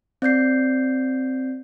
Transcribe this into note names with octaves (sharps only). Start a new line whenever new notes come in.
C4 D5 G6 C7